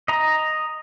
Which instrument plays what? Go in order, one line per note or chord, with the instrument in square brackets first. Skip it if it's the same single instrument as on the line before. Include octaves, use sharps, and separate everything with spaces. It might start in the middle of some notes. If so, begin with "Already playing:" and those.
[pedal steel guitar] D#5 A#5